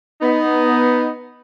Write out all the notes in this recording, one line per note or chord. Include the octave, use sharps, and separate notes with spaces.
B3 D#4